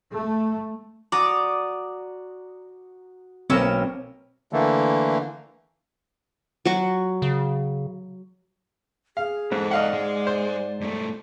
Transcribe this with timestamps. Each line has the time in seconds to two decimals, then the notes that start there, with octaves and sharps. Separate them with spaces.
0.14 A3
1.12 F#4 D5 A#5 D#6
3.50 B1 A#3 C4 C#4 A#4 E6
4.53 D3 E3 A3 A#3
6.65 F#3 F#4
7.22 C#3
9.17 G#4 F5
9.52 G#2 A4 C5
9.71 D5 D#5 F5 F#5
9.93 G#3
10.27 C5
10.81 G2 A3